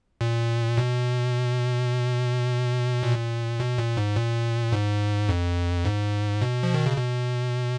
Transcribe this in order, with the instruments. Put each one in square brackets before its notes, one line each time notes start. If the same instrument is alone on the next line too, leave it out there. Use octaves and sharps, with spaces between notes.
[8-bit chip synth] A#2
B2
A#2
B2
A#2
G#2
A#2
G#2
F2
G#2
B2
F3
D#3
C#3
B2